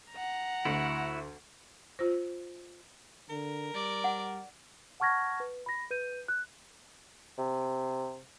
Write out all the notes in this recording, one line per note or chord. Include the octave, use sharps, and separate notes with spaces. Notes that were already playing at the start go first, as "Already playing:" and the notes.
F#5 A#5
D2 E4 F#4
F4 C5
D3 A#4
G3 D5
F#5
F#5 A5 C#6 F6 G#6 A#6
B4
B5 A#6
B4 G6 D#7
F#6
C3